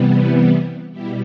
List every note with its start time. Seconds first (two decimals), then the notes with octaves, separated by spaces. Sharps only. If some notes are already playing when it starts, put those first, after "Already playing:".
Already playing: C3 E3 G3 B3
0.91 B2 G3 E4 G4